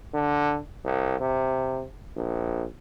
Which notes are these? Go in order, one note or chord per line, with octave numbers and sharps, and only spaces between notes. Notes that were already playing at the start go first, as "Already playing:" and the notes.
D3
C2
C3
A#1